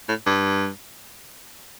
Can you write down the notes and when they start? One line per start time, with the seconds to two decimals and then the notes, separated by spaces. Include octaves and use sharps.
0.09 A2
0.27 G2